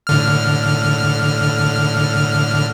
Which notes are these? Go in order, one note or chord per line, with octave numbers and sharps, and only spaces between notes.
A2 D3 F6